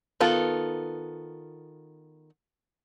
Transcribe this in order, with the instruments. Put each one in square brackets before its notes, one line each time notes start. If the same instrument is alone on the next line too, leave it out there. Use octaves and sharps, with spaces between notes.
[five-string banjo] D#3 B3 F4 A4